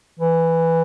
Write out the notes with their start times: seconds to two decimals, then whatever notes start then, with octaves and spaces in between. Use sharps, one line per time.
0.20 E3